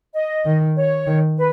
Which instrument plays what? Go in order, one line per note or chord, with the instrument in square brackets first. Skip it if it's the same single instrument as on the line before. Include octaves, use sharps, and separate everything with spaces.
[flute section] D#5
[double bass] D#3
[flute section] C#5
[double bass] D#3
[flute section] B4